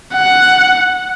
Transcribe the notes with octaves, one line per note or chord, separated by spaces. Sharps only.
F#5